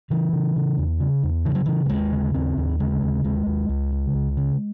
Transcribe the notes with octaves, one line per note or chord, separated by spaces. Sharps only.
C#3 E3
C#3
C#3
E2
C#3
E2
C#3 E3
F#3
C#3 E3
F#3
D#2 G#3
C#3
D#2 C4
D#2
C#3 G#3
D#2
D#2 G#3
D#2
C#2
C#3
C#2
C#3